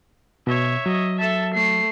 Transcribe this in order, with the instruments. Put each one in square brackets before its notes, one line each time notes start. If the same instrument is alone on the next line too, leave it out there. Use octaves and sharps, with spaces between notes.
[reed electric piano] B2 [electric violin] C#5 E5
[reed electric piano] F#3 [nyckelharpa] D#5
[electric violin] A4 A5 [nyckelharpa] E5
[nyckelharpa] A3 [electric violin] C7